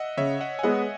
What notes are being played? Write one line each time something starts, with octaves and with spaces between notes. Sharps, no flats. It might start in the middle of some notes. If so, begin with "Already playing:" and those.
Already playing: D#5 E5 F#5
C#3 C#5 E5
D#5 F#5
G#5
G#3 B3 D#5 F#5